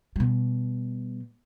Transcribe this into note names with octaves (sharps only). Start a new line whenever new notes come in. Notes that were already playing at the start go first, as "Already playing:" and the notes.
B2 G3